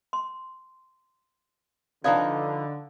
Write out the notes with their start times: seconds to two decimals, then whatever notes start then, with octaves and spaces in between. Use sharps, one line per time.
0.13 C6
2.04 D3 F3 D#4 B4 D5 F5 D#6